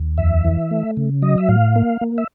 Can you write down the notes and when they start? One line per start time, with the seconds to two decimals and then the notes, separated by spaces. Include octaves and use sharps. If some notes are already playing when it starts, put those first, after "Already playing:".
Already playing: D#2
0.18 F2 E5
0.45 E3
0.71 A3
0.97 C#3
1.22 F#3 D#5
1.38 E5
1.49 A2 F5
1.76 A#3
2.01 A#3
2.18 E5